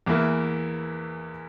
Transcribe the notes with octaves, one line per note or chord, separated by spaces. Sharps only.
E2 E3 A#3 E4